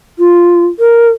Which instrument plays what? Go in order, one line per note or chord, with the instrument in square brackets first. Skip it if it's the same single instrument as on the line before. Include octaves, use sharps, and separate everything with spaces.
[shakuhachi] F4
A#4